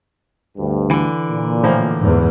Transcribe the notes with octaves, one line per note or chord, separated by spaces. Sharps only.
D2 G2
D3 E3
A#2
A2 F3 A#3
E2 G#2